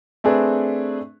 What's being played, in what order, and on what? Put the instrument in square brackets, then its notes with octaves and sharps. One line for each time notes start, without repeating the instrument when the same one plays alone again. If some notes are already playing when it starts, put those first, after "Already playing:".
[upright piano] A3 C4 D4 G#4 B4